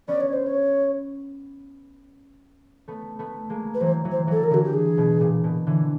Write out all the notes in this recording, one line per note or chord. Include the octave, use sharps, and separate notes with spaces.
B3 C#4 D5
C#5
C5
C#5
A3 B3
A3 B3
G#3 A#3
B4
E3 F#3 C5
E3 F#3
C5
E3 F#3 A4
A#4
D3 E3 F#4
G4
G#4
B2
A#2
B2
D3 E3